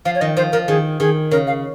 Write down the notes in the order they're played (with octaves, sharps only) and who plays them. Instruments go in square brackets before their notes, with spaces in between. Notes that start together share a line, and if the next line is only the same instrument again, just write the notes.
[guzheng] F3 [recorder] F5
[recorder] C#5
[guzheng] D#3 [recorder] D#5
[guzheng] F3 [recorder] C5
[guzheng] F3 [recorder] A#4
[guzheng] D#3 [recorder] G#4
[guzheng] D#3 [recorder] G#4
[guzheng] C#3 [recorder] A#4
[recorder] F5